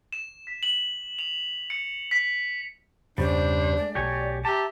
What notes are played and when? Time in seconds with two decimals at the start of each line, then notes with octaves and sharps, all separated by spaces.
0.13 E7
0.47 B6
0.63 F#7
1.19 F7
1.70 C#7
2.11 B6
3.18 E2 G2 C#3 G3 C#4 D4 C5
3.77 G#3 A3 D5
3.95 B1 B2 A3 G4 C#5 G#5
4.45 G4 E5 A5 A#5